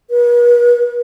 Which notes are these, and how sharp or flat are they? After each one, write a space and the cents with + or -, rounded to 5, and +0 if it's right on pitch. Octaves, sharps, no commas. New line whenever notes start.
B4 -45